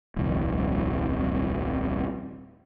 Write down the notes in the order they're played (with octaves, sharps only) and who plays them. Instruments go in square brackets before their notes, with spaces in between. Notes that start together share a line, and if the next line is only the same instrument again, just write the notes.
[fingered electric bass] D#1 C2 F2